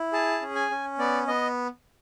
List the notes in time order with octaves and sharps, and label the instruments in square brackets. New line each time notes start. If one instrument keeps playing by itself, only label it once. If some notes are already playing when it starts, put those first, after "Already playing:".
Already playing: [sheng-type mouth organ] E4
G#4 A5
C#4
G#5
C#4
B3 D5
B3 D#5